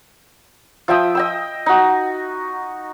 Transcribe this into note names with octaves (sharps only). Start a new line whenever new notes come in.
F3 E5 G5 D#6
D#5 G5 E6
D#4 F#4